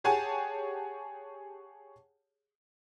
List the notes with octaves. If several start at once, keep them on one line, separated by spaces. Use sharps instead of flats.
G4 G#4 C#5 F#5 G#5 A5